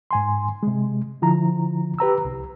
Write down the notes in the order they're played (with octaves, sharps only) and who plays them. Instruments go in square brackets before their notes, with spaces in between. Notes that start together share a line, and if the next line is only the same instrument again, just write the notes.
[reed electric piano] G#2 G#5 C6
C3 G#3
D3 F3 E4 A#5
G4 B4 A#5 E6
C2